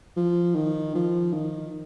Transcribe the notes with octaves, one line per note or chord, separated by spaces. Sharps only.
F3
D#3
F3
D#3